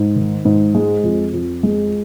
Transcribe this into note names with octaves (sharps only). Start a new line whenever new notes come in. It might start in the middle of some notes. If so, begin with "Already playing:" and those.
Already playing: G#2
D#3
G#2
G#3
F2
F2
G#3